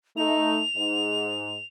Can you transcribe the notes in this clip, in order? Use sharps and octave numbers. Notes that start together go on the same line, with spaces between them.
A3 D#4 F7
G#2